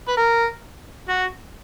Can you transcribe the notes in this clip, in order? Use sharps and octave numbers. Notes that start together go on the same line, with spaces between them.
B4
A#4
F#4